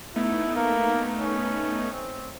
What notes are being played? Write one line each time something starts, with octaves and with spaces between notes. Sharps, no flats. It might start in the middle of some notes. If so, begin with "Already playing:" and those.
A3 B3 D#4 E4
A#3
C#4
C4